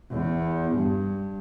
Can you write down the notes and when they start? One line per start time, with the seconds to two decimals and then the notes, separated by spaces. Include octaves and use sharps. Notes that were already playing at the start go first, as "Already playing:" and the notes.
0.11 E2
0.76 G2